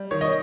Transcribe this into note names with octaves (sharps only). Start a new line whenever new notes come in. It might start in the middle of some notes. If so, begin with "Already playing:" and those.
Already playing: G3
D#3 C#5
D#5